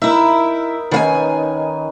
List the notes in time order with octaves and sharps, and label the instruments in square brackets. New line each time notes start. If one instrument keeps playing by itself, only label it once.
[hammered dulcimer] D#4 A#4 [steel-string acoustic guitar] E4 E5
[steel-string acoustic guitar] D#3 F5 G#5 [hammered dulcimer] C#4 D#4 B4